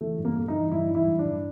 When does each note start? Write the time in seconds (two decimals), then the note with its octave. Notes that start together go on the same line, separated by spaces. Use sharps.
0.01 E3 A3
0.19 G2
0.25 A#3
0.37 G2
0.48 D#4
0.54 E3
0.71 G2 E4
0.89 E3
0.95 E4
1.07 G2
1.19 D4
1.24 G2